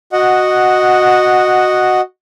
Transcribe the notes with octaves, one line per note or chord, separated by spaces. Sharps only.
F#4 D#5 F#5